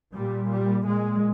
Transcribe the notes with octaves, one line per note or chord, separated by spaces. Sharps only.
A#2 G3
G3
A#2 G#3